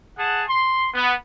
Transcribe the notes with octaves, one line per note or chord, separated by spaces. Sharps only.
G#4 F#5 A5
C6
B3